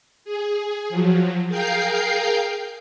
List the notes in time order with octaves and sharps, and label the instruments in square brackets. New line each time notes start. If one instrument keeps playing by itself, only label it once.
[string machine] G#4
F3 F#3
G#4 A#4 F5 G5 G6 C7